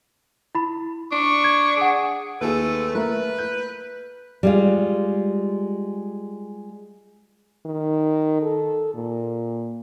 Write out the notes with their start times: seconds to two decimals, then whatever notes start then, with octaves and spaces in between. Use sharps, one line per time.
0.55 E4 B5
1.12 D4 C#6
1.44 G#6
1.77 G#4 F#5 D7
2.41 D#2 A3 G#4 A4 B4
2.95 A3 A#4 B4 E5
3.39 G6
4.43 G3 G#3 F4
7.66 D#3
8.42 A4
8.94 A#2